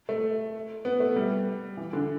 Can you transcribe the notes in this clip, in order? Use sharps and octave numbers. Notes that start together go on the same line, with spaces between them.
A3
B3
A3
G3
E3
D3